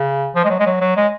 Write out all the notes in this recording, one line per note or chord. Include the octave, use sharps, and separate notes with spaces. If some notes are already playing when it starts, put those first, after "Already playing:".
Already playing: C#3
F3
G#3
F#3
G#3
F#3
F#3
G#3